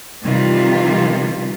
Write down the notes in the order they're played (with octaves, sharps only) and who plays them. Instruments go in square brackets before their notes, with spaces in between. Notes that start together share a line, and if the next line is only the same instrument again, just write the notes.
[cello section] C3 D#3 E3 G3 F4